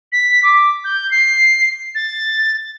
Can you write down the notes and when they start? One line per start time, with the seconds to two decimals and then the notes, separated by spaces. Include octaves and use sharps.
0.12 B6
0.43 D6
0.84 G6
1.11 C7
1.95 A6